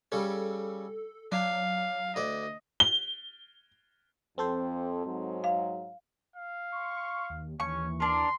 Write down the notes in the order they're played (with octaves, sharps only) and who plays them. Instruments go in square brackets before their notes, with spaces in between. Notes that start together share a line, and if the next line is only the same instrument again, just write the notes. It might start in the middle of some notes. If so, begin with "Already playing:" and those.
[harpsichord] C#3 G3 C#4 [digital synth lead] A4
[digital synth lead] F#3 [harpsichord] D4 [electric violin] F5
[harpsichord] D2 D5 [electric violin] D#5
[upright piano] G7
[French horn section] F2 [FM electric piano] C4 A4 C5
[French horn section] G#2 F#3
[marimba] F5
[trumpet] F5
[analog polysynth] C6 C#6
D#2
[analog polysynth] D#2 E3 [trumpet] C#4 [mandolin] C#6
[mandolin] D4 A#4 [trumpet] C6